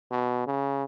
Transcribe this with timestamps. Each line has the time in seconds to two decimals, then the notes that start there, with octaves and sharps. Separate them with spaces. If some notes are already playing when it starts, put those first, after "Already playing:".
0.11 B2
0.47 C#3